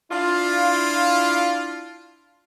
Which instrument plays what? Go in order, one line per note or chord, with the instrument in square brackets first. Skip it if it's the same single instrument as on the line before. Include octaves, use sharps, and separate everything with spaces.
[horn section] D4 E4 F4